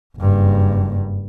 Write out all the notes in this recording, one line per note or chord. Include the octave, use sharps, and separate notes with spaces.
F#1 G2